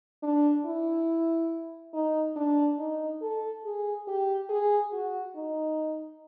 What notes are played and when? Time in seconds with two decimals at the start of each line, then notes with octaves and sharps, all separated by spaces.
0.23 D4
0.65 E4
1.94 D#4
2.36 D4
2.79 D#4
3.22 A4
3.64 G#4
4.08 G4
4.50 G#4
4.93 F#4
5.36 D#4